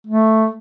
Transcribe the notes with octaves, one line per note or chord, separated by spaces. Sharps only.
A3